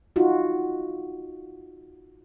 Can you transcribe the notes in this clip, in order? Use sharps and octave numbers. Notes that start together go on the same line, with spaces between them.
D#4 F4 F#4